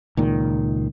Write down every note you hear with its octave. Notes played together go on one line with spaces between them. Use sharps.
C#2 A#2 D#3